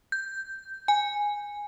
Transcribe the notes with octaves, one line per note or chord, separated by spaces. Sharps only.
G6
G#5